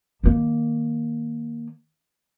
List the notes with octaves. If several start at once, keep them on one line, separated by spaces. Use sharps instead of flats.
D#3 A#3